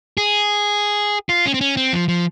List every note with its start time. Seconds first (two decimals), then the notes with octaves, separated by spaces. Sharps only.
0.17 G#4
1.29 F4
1.46 C#4
1.54 C4
1.61 C#4
1.77 C4
1.93 F3
2.08 F3